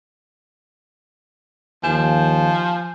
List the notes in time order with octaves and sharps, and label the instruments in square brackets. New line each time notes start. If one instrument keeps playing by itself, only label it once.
[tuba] D#2 [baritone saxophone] F3 [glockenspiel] G#5 G6 E7